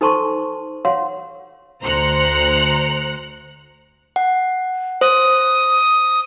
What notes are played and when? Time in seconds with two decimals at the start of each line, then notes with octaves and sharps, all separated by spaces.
0.01 D#4 A4 C5 A5 C6 C#6
0.85 C#5 F5 F#5 C6
1.82 D2 C5 A#5 F#6 C#7
4.16 F#5
5.01 C5 D#6